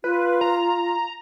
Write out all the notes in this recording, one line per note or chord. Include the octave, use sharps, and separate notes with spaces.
F4 B4
A#5